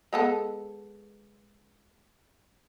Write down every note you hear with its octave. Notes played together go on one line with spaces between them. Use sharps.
G#3 B3 A4